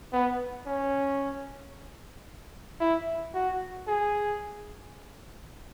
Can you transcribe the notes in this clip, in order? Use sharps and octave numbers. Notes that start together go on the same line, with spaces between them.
B3
C#4
E4
F#4
G#4